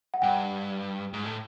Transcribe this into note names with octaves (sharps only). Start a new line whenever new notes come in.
F#5
G2 G5
G#2
A2